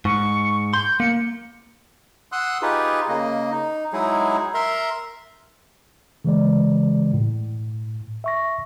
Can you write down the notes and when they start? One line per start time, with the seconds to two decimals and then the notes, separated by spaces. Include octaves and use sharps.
0.05 G#2 C#6
0.74 C6 G6
1.00 A#3 C#7
2.32 F#5 C6 D#6 E6 F#6
2.62 D#4 F4 G4 G#4 B4
3.09 C#3 A#3 D#5
3.51 D#4
3.93 F#3 G#3 D#4 E4 G#4
4.54 A#4 E5 A#5 C6
6.25 C#3 E3 G#3 D5
7.13 A2
8.24 E5 C#6 A#6